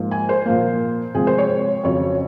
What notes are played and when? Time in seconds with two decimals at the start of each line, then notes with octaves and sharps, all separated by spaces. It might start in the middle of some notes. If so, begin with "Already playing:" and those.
Already playing: G#2 F3 A#3
0.11 G#5
0.29 C5
0.46 A#2 F3 A#3
1.14 C3 F3 G#3 G#4
1.27 C5
1.38 C#5
1.83 F2 C#3 F#3 C#5